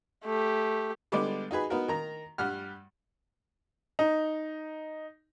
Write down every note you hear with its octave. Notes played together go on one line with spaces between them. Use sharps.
A3 G4
D3 G3 G#3 B3 D5
D#4 F#4 G#4 B4
B3 D#4 F#4 A#4
D#3 A#5
G2 G3 F#5 F6
D#4